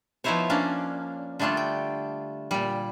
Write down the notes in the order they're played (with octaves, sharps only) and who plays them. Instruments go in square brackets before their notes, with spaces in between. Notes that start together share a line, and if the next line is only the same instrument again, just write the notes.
[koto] F3 B3 D#4 E4 C5 C#5
A#3 C#4 D4 F5
D3 G3 A3 D4 F4
G5
A#2 G3